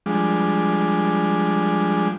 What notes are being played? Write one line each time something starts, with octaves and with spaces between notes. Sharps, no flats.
F3 G3 G#3 D4